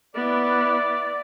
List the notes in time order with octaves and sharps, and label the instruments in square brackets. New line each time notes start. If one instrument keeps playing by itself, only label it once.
[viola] B3 E4 [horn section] D5